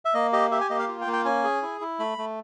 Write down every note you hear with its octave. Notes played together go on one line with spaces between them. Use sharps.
E5
A#3 D#5
G4 D#5
G4 E5
G#5
A#3 D#5
F5
F4
G5
A#3
G5
C#4 G#5
G#4
E4
E4
A3 B5
A3